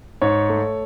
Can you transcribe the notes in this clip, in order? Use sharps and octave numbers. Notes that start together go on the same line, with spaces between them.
G#2 C#5
A3